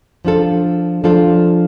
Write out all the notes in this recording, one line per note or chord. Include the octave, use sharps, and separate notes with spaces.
F3 D4 F4 A4
F3 D4 F4 A4